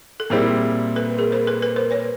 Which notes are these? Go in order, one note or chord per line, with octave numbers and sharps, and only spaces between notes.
A4
A#2 G3 C4 E4 G4 G#4 A#4
A4 B4
G#4 A#4
A#4 C5
A4 B4
A4 B4
A#4 C5
B4 C#5